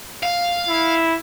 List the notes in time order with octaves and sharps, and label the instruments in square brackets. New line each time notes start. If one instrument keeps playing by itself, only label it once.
[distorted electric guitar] F5
[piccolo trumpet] E4